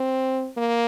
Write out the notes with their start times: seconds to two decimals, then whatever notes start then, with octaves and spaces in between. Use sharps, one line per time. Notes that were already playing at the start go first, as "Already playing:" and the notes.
Already playing: C4
0.57 A#3